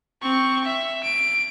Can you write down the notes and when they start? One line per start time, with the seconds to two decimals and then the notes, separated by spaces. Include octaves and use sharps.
0.22 C4 C#6
0.64 E5
1.03 D7